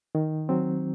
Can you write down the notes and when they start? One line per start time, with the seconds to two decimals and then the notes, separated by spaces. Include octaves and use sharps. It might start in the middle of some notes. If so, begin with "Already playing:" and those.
0.15 D#3
0.49 F#3 C4